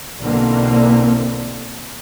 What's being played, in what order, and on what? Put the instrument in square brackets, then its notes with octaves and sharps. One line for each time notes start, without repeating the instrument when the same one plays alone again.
[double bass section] B1 B2 D3 E3 A#3 C4